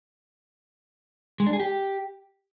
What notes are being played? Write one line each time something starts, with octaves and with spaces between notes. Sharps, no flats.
G#3
D4
G#4
G4